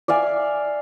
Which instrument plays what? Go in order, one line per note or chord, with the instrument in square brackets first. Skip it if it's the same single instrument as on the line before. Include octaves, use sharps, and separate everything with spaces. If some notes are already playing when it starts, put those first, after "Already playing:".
[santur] D5 E5 F5 G#5